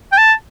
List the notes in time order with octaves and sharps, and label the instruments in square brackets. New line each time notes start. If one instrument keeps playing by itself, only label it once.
[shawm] G5
A5